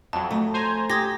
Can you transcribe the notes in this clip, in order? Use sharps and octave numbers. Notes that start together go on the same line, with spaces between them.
F2 F#3 A5
A3
C5 G#5 A#5
G4 D#6 G#6 A#6